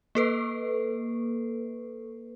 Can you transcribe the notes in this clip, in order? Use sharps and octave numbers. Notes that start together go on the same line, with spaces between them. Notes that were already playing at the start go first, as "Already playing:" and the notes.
A#3 A4 B4